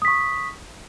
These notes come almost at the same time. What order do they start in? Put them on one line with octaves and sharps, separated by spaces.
D#6 B6 C#6